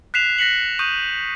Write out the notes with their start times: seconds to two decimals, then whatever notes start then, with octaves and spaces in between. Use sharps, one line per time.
0.14 F#6 B6 C7 E7 F7
0.38 F#6 A#6 B6 C#7 F#7
0.79 C#6 D#6 G6 D#7